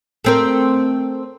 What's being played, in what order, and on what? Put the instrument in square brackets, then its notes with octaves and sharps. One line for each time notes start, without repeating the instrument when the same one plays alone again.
[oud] A3 C4 A#4